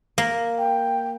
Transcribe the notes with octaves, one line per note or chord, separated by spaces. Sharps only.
A#3
G5